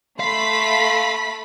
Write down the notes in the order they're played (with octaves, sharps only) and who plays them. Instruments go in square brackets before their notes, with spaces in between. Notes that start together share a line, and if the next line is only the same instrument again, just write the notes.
[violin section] A3 B5 B6 [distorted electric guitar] F5 [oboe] C6